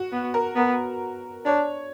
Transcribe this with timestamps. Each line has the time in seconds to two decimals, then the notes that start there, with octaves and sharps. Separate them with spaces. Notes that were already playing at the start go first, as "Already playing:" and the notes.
Already playing: F#4
0.12 B3
0.34 A#4
0.56 B3 A#4
1.45 D4 C#5